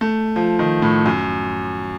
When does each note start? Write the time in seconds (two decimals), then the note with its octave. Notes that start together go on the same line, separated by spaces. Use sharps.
0.01 A3
0.36 F3
0.59 D#3
0.82 A2
1.06 F#2